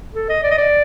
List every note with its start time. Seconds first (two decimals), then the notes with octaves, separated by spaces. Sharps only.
0.13 A4
0.29 D#5
0.43 D5
0.51 D#5
0.57 D5